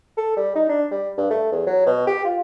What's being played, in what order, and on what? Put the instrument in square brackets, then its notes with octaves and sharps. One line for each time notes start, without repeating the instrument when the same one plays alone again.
[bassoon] A4
G3
D#4
D4
G3
G2
A3
E2
F#3
B2
G4
F4